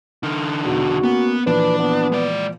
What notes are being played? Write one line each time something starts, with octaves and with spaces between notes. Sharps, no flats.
D3 D#4 F6
B1 E2 F#4
A#3 B3 C#4
A#2 E3 F3 D4 B4
B3
G#3 D5